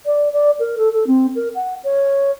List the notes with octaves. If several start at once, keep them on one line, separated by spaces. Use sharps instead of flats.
D5
D5
A#4
A4
A4
C4
A#4
F#5
C#5